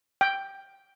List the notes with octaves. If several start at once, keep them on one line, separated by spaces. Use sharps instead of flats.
G5